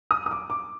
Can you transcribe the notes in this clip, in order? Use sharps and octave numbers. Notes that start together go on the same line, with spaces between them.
D#6
D#6
D6
D6